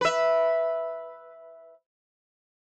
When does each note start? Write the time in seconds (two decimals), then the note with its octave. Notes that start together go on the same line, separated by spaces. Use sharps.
0.01 B4 E5